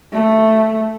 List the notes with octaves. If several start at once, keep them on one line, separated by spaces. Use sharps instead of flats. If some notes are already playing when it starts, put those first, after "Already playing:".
A3